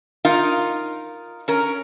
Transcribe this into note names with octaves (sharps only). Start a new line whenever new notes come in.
D#4 F4 A#4
C#4 A#4